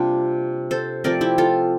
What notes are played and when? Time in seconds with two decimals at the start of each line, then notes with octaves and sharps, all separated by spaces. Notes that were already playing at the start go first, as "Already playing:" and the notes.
Already playing: C3 G3 A#3 D4 F4
0.71 A4 C5
1.04 F3 A3 C4 A#4 D5
1.21 E4 G4
1.38 F4 A4